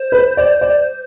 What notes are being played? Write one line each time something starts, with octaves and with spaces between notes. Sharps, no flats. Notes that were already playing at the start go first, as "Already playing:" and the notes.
Already playing: C5
B4
D5
D5